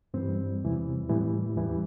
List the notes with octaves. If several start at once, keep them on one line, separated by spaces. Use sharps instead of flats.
G2 E3 G3 C4
E2 C3 E3 G3
A2 E3 G3
E2 E3 G3